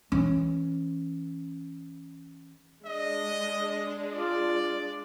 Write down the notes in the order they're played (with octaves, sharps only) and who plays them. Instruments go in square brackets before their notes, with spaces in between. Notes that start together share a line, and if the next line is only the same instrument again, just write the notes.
[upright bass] E3 C#4
[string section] G#3 D4 [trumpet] D#5
[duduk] F4 [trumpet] D5